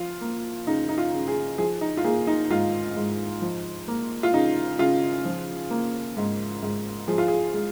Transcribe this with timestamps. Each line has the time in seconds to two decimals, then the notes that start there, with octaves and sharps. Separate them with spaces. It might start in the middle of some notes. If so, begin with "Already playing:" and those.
Already playing: F3 F4
0.21 A#3
0.67 C#3 D#4
0.89 D#4
0.98 F4
1.13 C#3
1.28 G#4
1.58 F3 G#4
1.81 D#4
1.97 F4
2.04 A#3 G#4
2.27 D#4
2.50 G#2 F4
2.97 G#2
3.42 F3
3.88 A#3
4.23 F4
4.33 C#3 D#4
4.79 C#3 F4
5.25 F3
5.70 A#3
6.17 G#2
6.62 G#2
7.08 F3 G#4
7.18 F4
7.28 G#4
7.54 G#3